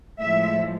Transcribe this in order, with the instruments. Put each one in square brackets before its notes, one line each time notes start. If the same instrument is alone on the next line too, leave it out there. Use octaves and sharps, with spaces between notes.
[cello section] A2 F3 G#3 E5